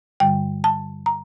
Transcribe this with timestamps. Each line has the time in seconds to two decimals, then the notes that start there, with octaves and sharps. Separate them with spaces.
0.20 G2 D3 G3 G5
0.64 A5
1.06 A#5